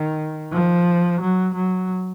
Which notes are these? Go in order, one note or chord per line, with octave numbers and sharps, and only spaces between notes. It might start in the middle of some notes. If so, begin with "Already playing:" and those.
Already playing: D#3
F3
F#3
F#3